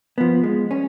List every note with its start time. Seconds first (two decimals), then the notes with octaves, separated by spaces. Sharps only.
0.18 F3 B3
0.44 G#3
0.71 C#4